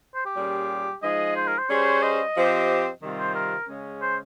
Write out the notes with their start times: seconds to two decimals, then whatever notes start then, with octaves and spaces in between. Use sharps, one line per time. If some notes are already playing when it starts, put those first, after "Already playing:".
0.15 C5
0.25 G4
0.36 A#2 G3 C#4 F4 G#4
1.03 F3 G#3 D#4 G#4 D#5
1.36 C5
1.48 A#4
1.58 C5
1.69 G3 C#4 G#4 C5 C#5
2.03 D#5
2.36 F3 C4 G4 C5
3.03 C3 D#3 G3 C4 F4
3.19 C5
3.35 A#4
3.68 C#3 G#3 C#4
4.02 C5